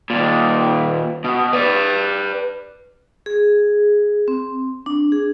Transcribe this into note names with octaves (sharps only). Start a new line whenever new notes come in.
D#2 A#2
B2
B4 D5
G#4
C4
D4
G#4